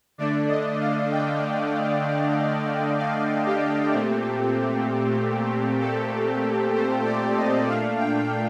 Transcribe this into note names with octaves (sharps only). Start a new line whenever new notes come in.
D3 A3 D4 D5
D#5
F5
G5
F5
G4
A#2 A3 C4
A4
C5
D5
D#5
A#2 A3 D4 F5
G5